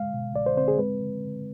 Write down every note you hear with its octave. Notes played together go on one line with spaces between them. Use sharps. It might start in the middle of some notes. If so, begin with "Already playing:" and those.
Already playing: G#3 F5
B2
C2 D5
C5
C4 C5
G#4
G#3 B4